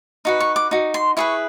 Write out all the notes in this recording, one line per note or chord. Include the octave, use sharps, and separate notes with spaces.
D#4 F#4 B4
C#6
D6
D#4 F#4
C6
E4 G#4 B4 C#6